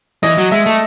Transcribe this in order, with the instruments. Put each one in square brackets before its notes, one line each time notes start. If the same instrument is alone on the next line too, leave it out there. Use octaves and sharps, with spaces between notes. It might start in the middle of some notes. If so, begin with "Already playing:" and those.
[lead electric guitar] E3 [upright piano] D#5
[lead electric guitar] F#3
[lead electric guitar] G#3 [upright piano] E5
[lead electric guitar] A3